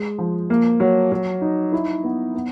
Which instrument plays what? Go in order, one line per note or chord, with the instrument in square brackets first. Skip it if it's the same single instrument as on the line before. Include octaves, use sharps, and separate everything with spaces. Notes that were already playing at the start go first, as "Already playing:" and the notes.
Already playing: [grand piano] G#3
F3
A#3
F#3
F#3
D#4
E4
B3
B3